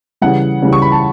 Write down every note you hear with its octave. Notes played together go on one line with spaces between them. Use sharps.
C#3 E3 G3 F#5
C#3 E3 G3
C#6
B5
A5